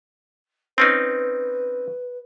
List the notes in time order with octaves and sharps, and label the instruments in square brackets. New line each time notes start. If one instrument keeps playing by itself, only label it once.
[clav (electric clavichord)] C4 C#4 D#4 [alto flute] B4